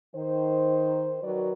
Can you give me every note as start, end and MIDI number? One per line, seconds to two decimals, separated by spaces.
0.15 1.17 51
0.15 1.17 72
1.22 1.53 51
1.22 1.53 54
1.22 1.53 66
1.22 1.53 70
1.22 1.53 71
1.22 1.53 74